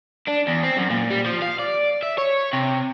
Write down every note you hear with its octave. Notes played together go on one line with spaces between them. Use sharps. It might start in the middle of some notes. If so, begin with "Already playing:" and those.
D4
E2
C4
F#2
A#2
G3
F3
F5
D5
E5
C#5
C3